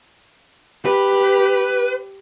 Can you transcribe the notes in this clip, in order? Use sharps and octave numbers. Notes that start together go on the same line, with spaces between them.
G4 B4